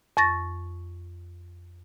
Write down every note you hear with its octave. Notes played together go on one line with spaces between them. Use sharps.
F2 C#6 A6 A#6